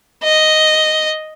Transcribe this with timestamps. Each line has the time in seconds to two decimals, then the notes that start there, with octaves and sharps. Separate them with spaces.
0.24 D#5